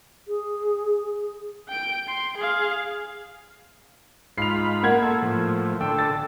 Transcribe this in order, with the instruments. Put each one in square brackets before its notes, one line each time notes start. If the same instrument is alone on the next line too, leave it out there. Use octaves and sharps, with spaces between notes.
[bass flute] G#4
[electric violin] G5 D7
C6
G#4 F5
[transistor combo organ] G#2 F4 B5 [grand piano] C7 F7
[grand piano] A#3 F#5 G#6
[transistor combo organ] A4
A2 F3
[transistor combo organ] D3 A4 [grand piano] G5
[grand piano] A6